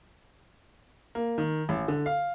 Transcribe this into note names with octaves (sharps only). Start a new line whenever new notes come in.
A#3
D#3
A1
D3
F5